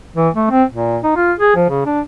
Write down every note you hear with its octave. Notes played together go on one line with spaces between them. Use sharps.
E3
A3
C4
A#2
D#4
F4
G#4
F3
C#3
D4